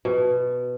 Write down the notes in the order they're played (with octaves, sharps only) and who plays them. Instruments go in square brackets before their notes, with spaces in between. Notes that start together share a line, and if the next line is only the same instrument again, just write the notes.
[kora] B2